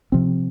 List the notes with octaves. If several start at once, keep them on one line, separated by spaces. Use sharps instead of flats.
C3 F3 C4